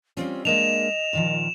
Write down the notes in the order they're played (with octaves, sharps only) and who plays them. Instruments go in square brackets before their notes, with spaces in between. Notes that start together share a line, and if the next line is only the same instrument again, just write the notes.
[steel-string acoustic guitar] G3 C4 C#4 [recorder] F4
[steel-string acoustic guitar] G#3 A#3 D4 [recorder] D#5 [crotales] E7 F7
[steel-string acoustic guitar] A#2 D#3 F3